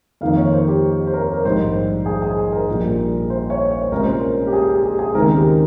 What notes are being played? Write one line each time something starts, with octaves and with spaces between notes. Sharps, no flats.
F2 D#3 A#3 D#4 F5
C#5
C5
G4
C5
A#4
A#4
A#1 G#2 G3 C5
G#4
G#4
A#4
A#1 A#2 G3
C5
C#5
C#5
C5
C2 A#2 G#3 C#4 F4 A#4
C5
G4
G#4
G4
G4
G#4
D#2 C#3 G#3 C4 D#4 A#4
G4